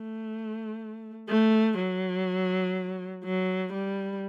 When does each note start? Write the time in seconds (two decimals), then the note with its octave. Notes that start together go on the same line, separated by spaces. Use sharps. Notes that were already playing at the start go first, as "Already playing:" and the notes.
Already playing: A3
1.29 A3
1.78 F#3
3.24 F#3
3.73 G3